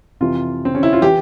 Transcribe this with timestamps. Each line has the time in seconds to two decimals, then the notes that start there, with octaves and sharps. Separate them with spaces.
0.21 F2 C3 E3 F4
0.65 C4
0.75 C#4
0.83 E4
0.93 F4
1.02 E3 G4